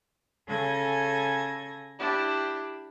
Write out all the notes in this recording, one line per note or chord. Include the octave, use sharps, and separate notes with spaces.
C#3 A4 G#5 G#6 A#6
D4 E4 G4